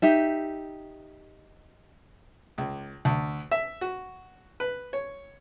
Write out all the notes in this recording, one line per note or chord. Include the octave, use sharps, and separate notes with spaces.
D#4 G4 E5
C#2
D2
E5
F#4
B4
C#5